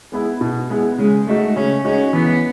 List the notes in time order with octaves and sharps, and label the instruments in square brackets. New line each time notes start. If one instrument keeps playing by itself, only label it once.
[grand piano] G#3 B3 E4
B2
G#3 B3 E4
[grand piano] C#3 [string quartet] G#3
[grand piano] G#3 D#4 F#4 [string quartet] A3
[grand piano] C#3 [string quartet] C#4
[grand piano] G#3 D#4 F#4 [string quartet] C#4
[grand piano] E3 [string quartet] B3